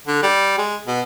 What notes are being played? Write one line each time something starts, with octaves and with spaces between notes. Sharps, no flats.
D3
G3
G#3
B2